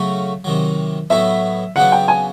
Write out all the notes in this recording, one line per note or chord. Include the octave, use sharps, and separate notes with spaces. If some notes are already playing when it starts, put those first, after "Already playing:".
Already playing: C#3 F#3 A3 C#4 F#4
C3 D#3 F#3
A2 F#3 B3 E4 E5
C#3 F#3 B3 D4 F#5
G5
G#5